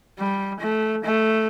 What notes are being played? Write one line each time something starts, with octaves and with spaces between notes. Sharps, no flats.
G3
A3
A3